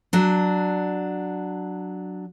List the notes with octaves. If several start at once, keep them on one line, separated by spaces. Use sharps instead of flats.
F#3 D4